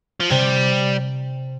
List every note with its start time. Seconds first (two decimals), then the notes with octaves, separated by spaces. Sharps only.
0.20 F3
0.30 C3 G3